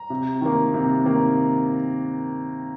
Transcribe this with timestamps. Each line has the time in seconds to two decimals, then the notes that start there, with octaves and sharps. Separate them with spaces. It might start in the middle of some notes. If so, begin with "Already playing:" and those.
Already playing: A#5
0.10 C3
0.41 D#3 A#3
0.74 C3
1.06 D#3 A#3